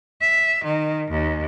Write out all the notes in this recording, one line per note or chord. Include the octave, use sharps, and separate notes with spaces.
E5
D#3
D#2